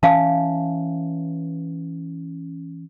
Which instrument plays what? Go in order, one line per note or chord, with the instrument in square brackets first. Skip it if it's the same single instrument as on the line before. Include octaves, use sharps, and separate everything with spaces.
[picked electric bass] E3 C#4 [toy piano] F5 A5